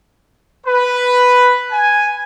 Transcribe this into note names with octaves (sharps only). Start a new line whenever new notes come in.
B4
G#5